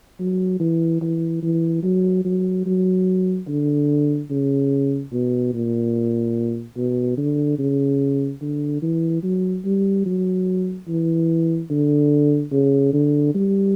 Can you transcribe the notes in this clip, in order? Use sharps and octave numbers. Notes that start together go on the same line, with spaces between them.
F#3
E3
E3
E3
F#3
F#3
F#3
D3
C#3
B2
A#2
B2
D3
C#3
D3
E3
F#3
G3
F#3
E3
D3
C#3
D3
G3